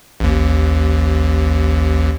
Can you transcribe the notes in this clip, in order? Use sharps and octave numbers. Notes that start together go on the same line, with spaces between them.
A1 D#2